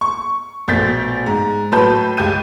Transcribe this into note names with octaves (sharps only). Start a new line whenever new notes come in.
C#6
A#1 B2 A3 G6 A6 B6
G#2
A2 F#3 B4 A5 B5 G6
C#2 G4 G6 D#7